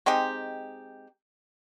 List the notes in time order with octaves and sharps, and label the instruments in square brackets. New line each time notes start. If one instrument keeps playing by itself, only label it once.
[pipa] G#3 C4 D#4 G4